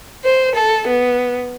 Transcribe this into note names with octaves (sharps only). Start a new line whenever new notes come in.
C5
A4
B3